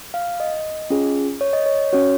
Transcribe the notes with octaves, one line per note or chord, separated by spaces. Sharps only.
F5
D#5
C#4 F4 G#4
C#5
D#5
C#5
C#4 F#4 C#5